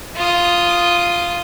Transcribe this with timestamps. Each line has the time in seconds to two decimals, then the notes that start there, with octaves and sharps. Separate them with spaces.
0.16 F4 D#6